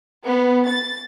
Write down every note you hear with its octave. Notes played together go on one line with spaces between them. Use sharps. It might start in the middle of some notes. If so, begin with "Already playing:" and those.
B3
A6